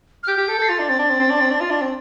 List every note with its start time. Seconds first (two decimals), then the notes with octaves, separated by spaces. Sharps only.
0.23 F6
0.27 G4 G6
0.38 G4
0.48 A4
0.59 A4 C7
0.68 F4 A6
0.79 D4
0.89 C4 A6
0.99 D4
1.09 C4
1.20 C4
1.30 D4
1.40 C4
1.51 D4
1.61 F4
1.70 D4
1.81 C4